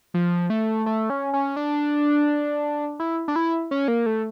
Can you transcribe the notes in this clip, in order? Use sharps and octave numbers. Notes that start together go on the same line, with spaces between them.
F3
A3
A3
C#4
C#4
D4
E4
D4
E4
C#4
A#3
A3